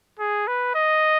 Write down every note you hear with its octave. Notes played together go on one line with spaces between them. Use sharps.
G#4
B4
D#5